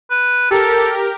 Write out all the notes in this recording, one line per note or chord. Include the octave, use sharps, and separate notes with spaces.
B4
G4 A4 A#4